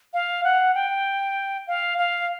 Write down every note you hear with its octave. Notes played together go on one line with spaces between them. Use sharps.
F5
F#5
G5
F5
F5